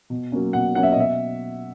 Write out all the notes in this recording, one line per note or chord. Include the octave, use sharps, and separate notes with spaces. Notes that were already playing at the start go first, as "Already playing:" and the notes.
B2
F#3 A#3 C#4
B2 F#5
F#3 A#3 C#4 F#5
E5
D#5
B2 E5